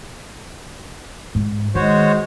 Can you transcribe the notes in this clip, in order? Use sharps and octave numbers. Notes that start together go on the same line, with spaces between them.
G#2
D#3 G#3 F#4 C5 C#5